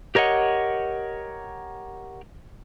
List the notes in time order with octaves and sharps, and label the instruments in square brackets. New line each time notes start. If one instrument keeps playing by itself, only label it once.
[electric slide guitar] G4 A#4 C#5 D#5 F#5